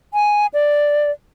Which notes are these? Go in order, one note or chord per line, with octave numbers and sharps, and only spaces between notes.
G#5
D5